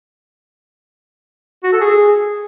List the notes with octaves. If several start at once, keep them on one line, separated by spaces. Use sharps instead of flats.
F#4
A4
G#4